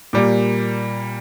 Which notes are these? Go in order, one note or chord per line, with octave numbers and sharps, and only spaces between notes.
A#2 G3 A#3 D6